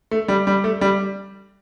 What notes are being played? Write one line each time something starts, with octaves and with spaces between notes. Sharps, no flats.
A3
G3
G3
A3
G3